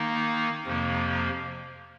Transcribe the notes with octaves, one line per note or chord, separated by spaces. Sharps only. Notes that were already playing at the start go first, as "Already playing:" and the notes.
Already playing: D#3 A#3 D#4
F2 C3 F3 A#3